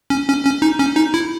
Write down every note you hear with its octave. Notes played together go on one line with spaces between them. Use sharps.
C#4
C#4
C#4
D#4
C#4
D#4
E4